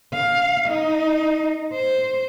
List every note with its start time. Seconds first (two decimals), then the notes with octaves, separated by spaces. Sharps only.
0.13 F5
0.68 D#4
1.74 C5